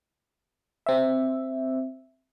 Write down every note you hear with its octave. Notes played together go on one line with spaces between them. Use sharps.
C4 E5